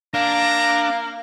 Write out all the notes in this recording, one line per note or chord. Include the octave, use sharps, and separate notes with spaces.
A#3 D4 F5 A#5